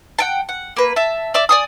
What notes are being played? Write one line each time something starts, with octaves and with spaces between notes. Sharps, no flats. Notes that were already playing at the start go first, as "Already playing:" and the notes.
F#5 G5 A5
F#5
A#3 B4
E5 A5
D5 E5 D6
D5 G#5 D#6